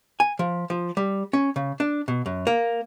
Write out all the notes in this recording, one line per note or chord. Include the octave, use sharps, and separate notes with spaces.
G#5
F3
F3
G3
C#4
C#3
D4
B2
F#2
A#3